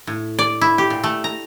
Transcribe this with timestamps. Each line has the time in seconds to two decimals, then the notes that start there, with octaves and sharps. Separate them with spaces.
0.07 A2
0.39 D5
0.61 E4
0.78 G4
0.90 A#2
1.04 A3
1.24 A#5